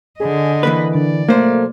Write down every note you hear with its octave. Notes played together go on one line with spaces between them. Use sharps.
D3 G#4 D#5
E3 A#3 B4 B5
D3 D5
B1 A3 A#3 C5